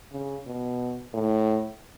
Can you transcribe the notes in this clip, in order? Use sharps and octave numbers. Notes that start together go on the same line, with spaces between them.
C#3
B2
A2